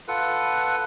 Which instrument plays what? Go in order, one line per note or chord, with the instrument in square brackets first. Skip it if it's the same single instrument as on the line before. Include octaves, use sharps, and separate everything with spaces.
[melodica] F4 A4 B4 F#5